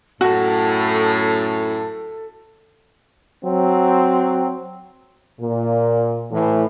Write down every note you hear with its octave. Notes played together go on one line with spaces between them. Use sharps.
F#2 A2 F#4 A4
F#3 C4
A#2
A2 E3